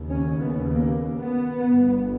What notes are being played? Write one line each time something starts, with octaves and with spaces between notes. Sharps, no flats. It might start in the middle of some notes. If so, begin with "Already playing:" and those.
Already playing: D#2 C#3
C#4
B3
A#3
B3
G1 G2